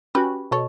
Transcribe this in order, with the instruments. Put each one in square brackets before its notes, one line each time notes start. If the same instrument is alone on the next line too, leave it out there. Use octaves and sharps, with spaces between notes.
[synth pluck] C#4 F#4 [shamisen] G4 B4
[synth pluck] B2 [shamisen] A4 C#5